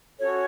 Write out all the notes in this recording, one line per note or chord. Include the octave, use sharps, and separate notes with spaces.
C#4 F#4 A4 C#5